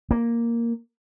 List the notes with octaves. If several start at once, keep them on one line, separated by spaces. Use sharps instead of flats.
A#3